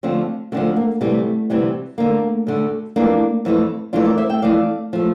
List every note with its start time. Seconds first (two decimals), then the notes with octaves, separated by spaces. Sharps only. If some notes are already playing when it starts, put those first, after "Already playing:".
0.03 D2 D3 F3 A3 C4
0.52 D2 D3 F3 A3 C4
0.76 A#3
1.01 D2 C3 E3 G3 A3
1.50 D2 C3 E3 G3
1.98 D2 D3 A3 A#3
2.47 D2 D3 A3
2.96 F2 E3 A3 A#3 D4
3.45 F2 E3 A3
3.93 F2 E3 A3 D4 F4
4.05 A#4 D5
4.18 C5 E5
4.29 E5 G5
4.42 F2 E3 A3 D5 F5
4.93 F3 A3